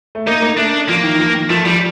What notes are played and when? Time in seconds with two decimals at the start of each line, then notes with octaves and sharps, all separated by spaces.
0.15 A3
0.27 A#3 D#4
0.42 A#3
0.57 A3 D4
0.88 F3 A#3
1.03 D#3
1.14 D#3
1.19 F3
1.34 D#3
1.49 F3 A3
1.65 F3 G3